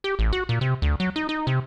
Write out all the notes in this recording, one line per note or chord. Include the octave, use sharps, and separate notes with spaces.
G4
A1
F#4
A#2
C3
D2
F#3
D#4
D#4
C3